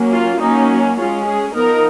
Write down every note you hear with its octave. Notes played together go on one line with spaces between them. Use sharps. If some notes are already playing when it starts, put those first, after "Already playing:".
Already playing: F#3 A#3 C#4
F4
F#3 A#3 C#4 D#4
G#3 C#4 F4
G#4
F3 B3 D#4 A#4